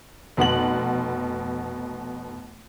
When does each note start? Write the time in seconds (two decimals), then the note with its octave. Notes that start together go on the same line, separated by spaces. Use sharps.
0.37 F1 B2 F#5 F#7